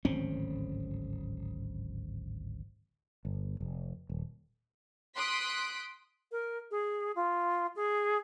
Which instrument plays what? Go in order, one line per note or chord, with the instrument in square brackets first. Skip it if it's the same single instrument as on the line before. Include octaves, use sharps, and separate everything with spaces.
[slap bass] D1 G#1 C4 C#4
[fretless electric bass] G1
F1
D#1
[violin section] C6 D#6 F#6 B6 D7
[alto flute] A#4
G#4
F4
G#4